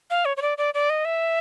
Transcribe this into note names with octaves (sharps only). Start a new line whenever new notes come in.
F5
C#5
C#5
D5
D5
D5
D#5
E5